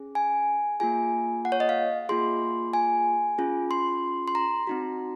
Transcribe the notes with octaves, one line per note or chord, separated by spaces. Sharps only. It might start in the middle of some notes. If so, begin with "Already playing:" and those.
Already playing: C#4 G#4
G#5
A#3 F4 G#4 G#5
F#5
C#5
D#5
F5
A#3 F4 G#4 C6
G#5
C#4 F4 G#4
C6
C6
A#5
C4 D#4 F#4